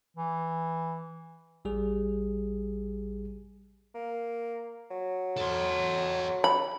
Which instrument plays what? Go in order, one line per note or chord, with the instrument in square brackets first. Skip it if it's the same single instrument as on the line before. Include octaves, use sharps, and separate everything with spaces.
[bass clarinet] E3
[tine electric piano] A1 G3 G#4
[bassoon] A#3
F#3
[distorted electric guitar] A4 C5
[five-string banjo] B5